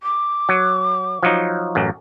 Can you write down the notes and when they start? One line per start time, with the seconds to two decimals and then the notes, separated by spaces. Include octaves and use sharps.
0.03 D6
0.49 F#3
1.23 F3 F#3 D#4
1.75 A1 F#2